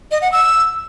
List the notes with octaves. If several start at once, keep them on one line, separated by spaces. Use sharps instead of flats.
D#5
F#5
E6